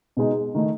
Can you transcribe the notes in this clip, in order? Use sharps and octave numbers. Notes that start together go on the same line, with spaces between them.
B2 G#3 D#4
D#3 A3 D#4